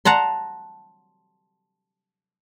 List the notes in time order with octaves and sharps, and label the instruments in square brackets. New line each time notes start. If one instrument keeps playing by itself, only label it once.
[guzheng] F#5 A5 A#5 C6